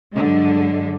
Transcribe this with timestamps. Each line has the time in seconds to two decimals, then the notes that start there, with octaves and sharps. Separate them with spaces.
0.14 G2 D3 F#3 G#3